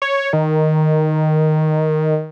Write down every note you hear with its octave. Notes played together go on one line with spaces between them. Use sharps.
C#5
D#3